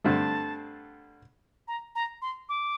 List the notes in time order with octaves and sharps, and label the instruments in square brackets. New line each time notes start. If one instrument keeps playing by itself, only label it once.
[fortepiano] G2 D3 A3 C4 [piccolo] A5
[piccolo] A#5
A#5
C6
D6